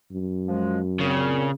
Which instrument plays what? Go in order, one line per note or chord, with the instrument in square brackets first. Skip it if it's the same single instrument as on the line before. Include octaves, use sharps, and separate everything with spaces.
[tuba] F#2
[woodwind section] F3 G#3
[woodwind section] A#2 C4 [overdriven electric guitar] C#3